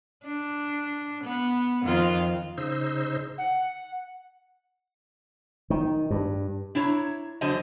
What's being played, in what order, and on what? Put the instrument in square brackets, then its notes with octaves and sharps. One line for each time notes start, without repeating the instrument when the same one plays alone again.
[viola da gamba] D4
B3
F2 D#3 F4
[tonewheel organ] C#3 D#4 C5 E6
[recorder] F#5
[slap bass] D#3
G2
[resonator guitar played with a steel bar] D4 E4 C#5 A5 A#5
E2 D3 F#3 C5 D#5 A5